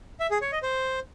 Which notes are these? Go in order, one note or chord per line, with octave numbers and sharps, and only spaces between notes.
E5
G#4
C#5
D#5
C5